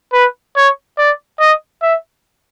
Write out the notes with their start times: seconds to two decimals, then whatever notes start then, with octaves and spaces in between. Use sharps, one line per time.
0.12 B4
0.56 C#5
0.98 D5
1.39 D#5
1.82 E5